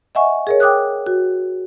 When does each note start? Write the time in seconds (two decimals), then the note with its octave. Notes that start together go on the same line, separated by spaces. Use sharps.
0.15 D#5 E5 F#5 G#5 C#6
0.47 G#4 A#4 C#5
0.60 G5 D6 D#6 F#6
1.07 F#4